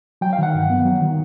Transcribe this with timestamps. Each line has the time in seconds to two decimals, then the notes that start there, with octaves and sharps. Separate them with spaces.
0.21 F#3 G5
0.33 F5
0.38 D#3 F#5
0.54 G2
0.70 B3
0.85 F#3
1.02 D#3